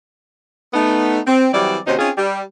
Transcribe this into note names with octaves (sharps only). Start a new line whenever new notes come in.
A3 B3 D#4
C4
E3 F#3 G3 C4 E4 D5
D#2 C3 C#4 D#4 F#4 C5
C4 C#4 D#4 F4 G#4
G3